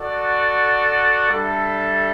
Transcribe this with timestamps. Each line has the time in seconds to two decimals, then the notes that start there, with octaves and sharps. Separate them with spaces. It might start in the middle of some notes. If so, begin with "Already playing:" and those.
Already playing: F#4 A4 D5 F#5
1.28 G3 D4 A4 E5